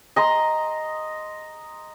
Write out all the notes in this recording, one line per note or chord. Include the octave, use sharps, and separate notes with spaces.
D#5 A#5 C6